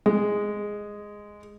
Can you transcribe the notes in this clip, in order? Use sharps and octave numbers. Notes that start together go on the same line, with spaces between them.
G#3